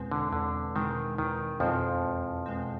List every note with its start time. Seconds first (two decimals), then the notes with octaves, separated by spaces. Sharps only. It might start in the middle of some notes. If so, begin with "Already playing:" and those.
Already playing: E2 B2 G#3 C4
0.11 D3
0.33 E2 D3
0.75 B2 D#3 G#3 C4
1.18 E2 D#3
1.60 F2 B2 F3 G#3 C4
2.03 E2
2.46 B2 G#3 C4